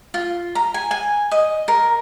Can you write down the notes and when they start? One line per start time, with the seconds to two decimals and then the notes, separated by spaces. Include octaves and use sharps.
0.14 F4
0.55 A#5
0.74 G#5
0.91 G#5
1.31 D#5
1.68 A#4